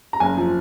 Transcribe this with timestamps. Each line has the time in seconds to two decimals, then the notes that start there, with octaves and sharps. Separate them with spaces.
0.13 A#5
0.20 F#1 G#5
0.37 F3